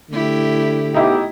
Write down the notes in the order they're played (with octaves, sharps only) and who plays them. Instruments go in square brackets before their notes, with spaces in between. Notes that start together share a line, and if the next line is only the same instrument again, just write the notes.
[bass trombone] D3 [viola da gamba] A3 E4 G4
[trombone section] B1 G4 [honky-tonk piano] D#4 E4